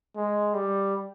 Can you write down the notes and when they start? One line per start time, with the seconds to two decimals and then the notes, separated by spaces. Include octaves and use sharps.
0.16 G#3
0.54 G3